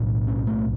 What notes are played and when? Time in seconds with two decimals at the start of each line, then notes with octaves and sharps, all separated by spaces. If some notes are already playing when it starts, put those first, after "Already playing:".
Already playing: B1 A2
0.27 C#4
0.47 A3